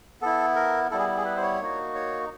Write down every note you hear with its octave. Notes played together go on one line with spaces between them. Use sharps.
B3 E4 A4
A#4
G3 B3 E4 A4
G#4
G#4
B4
C5
C#5
A#3 D#4 F#4
C#5